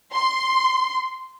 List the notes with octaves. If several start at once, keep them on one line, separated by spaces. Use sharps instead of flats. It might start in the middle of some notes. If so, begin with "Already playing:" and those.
C6